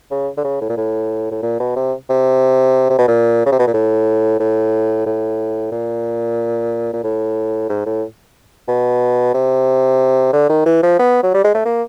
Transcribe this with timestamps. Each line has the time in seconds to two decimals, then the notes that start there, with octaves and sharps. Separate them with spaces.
0.11 C#3
0.37 D3
0.44 C#3
0.61 A2
0.70 A#2
0.77 A2
1.31 A2
1.43 A#2
1.60 B2
1.76 C3
2.09 C3
2.90 C3
2.99 B2
3.08 A#2
3.46 C#3
3.52 C3
3.59 B2
3.67 A#2
3.74 A2
4.40 A2
5.06 A2
5.72 A#2
6.93 A#2
7.04 A2
7.69 G#2
7.86 A2
8.68 B2
9.34 C3
10.33 D3
10.50 D#3
10.66 E3
10.83 F3
10.99 B3
11.23 F#3
11.34 G3
11.44 G#3
11.55 A3
11.65 A#3